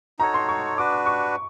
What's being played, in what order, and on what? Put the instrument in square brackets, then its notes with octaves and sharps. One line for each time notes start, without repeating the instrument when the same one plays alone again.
[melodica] D#4 F#4 A4 C#5 [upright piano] A#5
[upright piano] C6
C#6
[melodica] D4 F#4 B4 [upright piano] D6
[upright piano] D6
C#6